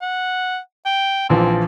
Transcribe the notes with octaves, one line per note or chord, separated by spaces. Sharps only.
F#5
G5
A#1 E3 F3 C4